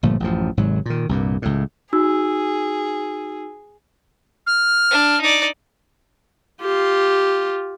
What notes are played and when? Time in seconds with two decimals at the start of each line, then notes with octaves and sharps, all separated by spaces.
0.03 G1 A#2 F3 A3
0.20 A1 F#2 F3
0.57 G#1 G#2 C3 F#3
0.86 A#2 D#3
1.09 C2 G2 A#2
1.42 C#2 A2
1.93 D#4 F#4 G#4 E6
4.47 F6
4.91 D4
5.21 D#4 D5
6.62 F4 G4